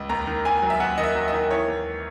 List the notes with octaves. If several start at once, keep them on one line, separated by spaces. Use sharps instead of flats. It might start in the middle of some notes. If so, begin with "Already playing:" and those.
Already playing: C#2
D#2 A#5
D#3
D#2 G#5
F#3
E5
D#2 F#5
D#3 D#5
E5
F#3
D#5
D#3
E3 C#5
D#2